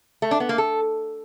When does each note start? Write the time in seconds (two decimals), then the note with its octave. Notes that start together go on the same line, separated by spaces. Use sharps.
0.22 A3
0.31 D4
0.40 B3
0.49 A#3
0.58 A4